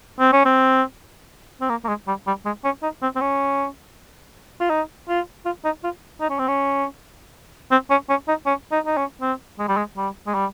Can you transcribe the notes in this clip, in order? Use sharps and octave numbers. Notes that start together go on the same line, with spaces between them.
C4
C#4
C4
C4
A#3
A#3
G#3
G3
G3
G#3
C#4
D#4
C4
C4
C#4
F4
D#4
F4
F4
D#4
F4
D#4
C#4
C4
C#4
C4
C#4
C#4
D#4
C#4
D#4
D#4
C#4
C4
G#3
G3
G#3
G3
G#3
G3